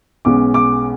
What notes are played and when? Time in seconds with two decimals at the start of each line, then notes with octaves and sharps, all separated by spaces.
0.25 B1 B2 G#3 C#4 D6
0.54 D6